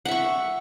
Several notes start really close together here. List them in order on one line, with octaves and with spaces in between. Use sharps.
F#5 E5 C#6